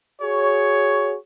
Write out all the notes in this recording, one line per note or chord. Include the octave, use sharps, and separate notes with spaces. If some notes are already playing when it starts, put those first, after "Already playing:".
F#4 G#4 C#5